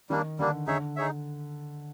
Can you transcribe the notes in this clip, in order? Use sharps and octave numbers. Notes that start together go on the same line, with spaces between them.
D#3 G3 A#3 D4
D3 G3 A#3 D4
D3 D#4 G#4 C#5 E5
D#4 G#4 C#5 E5